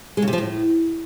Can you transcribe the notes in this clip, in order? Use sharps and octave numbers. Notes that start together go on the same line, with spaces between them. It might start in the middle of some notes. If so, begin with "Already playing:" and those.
G#3
C#3
C3
F3
A2